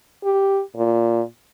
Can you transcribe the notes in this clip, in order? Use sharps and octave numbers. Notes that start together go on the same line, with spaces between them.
G4
A#2